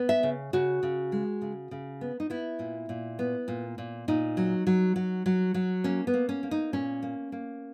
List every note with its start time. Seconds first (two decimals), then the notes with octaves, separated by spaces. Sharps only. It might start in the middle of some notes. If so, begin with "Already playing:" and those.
Already playing: B3
0.09 E5
0.23 C#3
0.53 C#3 F#4
0.83 C#3
1.12 G#3
1.42 C#3
1.71 C#3
2.01 B3
2.20 D#4
2.30 B3 E4
2.59 A#2
2.89 A#2
3.19 B3
3.48 A#2
3.78 A#2
4.08 A#2 D#4
4.37 F#3
4.67 F#3
4.96 F#3
5.26 F#3
5.54 F#3
5.84 A#3 C#4
6.07 B3
6.14 A#3
6.29 C#4
6.43 A#3
6.51 D#4
6.73 A#2 C#4
7.03 A#3
7.32 A#3